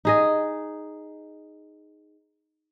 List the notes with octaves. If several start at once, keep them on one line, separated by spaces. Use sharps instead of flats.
D#4 G#4 D#5